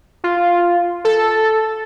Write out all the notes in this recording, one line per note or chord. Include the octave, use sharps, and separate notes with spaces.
F4
A4